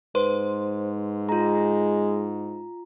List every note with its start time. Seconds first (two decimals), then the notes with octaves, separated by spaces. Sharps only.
0.15 G#2 B4 C5 C6
1.29 G#3 F4 A#5